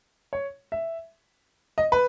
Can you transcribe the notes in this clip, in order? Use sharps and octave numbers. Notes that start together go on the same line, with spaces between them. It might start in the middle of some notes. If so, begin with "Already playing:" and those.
C#5
E5
D#5
B4